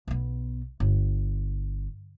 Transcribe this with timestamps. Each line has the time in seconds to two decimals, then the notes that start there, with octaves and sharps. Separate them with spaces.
0.07 B1 B3
0.80 G1